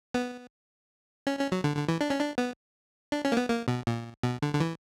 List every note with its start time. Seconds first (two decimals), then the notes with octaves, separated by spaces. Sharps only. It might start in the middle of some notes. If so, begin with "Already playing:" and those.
0.14 B3
1.27 C#4
1.39 C#4
1.52 F#3
1.64 D3
1.76 D3
1.88 E3
2.01 D4
2.10 C#4
2.19 D4
2.38 B3
3.12 D4
3.25 C#4
3.32 A#3
3.37 B3
3.50 A#3
3.68 B2
3.87 A#2
4.23 B2
4.42 D3
4.55 D3
4.60 E3